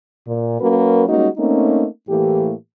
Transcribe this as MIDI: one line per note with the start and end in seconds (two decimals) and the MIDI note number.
0.27 0.57 46
0.60 1.04 54
0.60 1.04 58
0.60 1.04 61
0.60 1.04 66
0.60 1.04 70
0.60 1.04 71
1.08 1.28 55
1.08 1.28 56
1.08 1.28 58
1.08 1.28 61
1.08 1.28 63
1.08 1.28 66
1.38 1.86 57
1.38 1.86 58
1.38 1.86 60
1.38 1.86 61
1.38 1.86 63
2.09 2.53 45
2.09 2.53 52
2.09 2.53 57
2.09 2.53 58
2.09 2.53 67